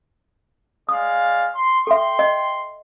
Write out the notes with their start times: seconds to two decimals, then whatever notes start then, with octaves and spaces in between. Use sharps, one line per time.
0.89 G#3 D5 F5 D#6
1.54 C6
1.87 A4 E5 G5 C6
2.19 D#5